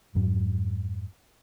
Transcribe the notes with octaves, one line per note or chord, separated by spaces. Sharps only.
F2 G#2 F#3